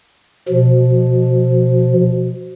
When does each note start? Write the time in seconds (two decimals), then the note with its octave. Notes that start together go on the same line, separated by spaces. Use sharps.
0.48 B2 F3